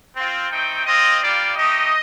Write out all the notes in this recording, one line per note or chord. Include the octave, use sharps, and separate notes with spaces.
C4 F4
A3 C4 D#4 G5
C4 F4 D#5
G3 A#3 F4 D5
A3 D#4 G4 D#5